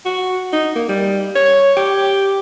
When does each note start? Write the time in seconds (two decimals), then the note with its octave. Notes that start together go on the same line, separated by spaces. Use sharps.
0.06 F#4
0.53 D#4
0.76 A#3
0.89 G3
1.36 C#5
1.77 G4